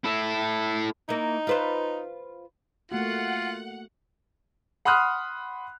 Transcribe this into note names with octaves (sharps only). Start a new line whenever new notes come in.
E4 A4
A#3 D#4 E4
F4 B4 C5
A3 A#3 F4 F#4 F#5
F#5 B5 C6 D#6 F6 F#6